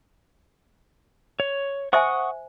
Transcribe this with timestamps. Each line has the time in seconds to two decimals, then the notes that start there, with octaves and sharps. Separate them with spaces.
1.40 C#5
1.93 C5 E5 F#5 G#5 C#6 D#6